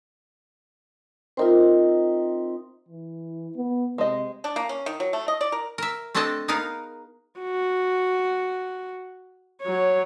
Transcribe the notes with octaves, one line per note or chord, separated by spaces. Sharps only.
C4 D#4 F4 A#4 C5 E5
E3
B3
C3 G#3 C5 D#5
D4
A#3
C#4
D#3
F#3
A3
D#5
D5
A#4
A#4 E5
A3 C4 D4 A4 D#5 A5
B3 D#4 G#4 A#4 F5
F#4
F#3 C#5